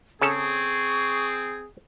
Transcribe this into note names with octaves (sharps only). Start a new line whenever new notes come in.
C#3 C4 C#4 G#4 A4 C#6